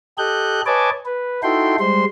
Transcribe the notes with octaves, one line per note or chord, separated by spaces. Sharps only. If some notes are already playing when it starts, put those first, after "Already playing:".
G4 A4 D#5 F#6 G6
B4 C#5 D#5 G#5 A5 D6
B4
D#4 E4 F#4 A4 G5 C6
G3 G#3 C5 C6